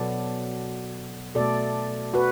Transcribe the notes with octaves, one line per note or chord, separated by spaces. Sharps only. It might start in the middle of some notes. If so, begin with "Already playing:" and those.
Already playing: B2 F#3 B3 A4 D5
B2 A3 A4 D5
F#4 B4